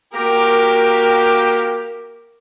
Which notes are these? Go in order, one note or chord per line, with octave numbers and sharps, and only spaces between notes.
A#3 F#4 G4 A#4